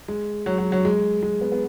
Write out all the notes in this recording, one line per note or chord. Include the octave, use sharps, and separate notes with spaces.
G#3
F#3
F#3
F#3
G#3
G#3
B3
B3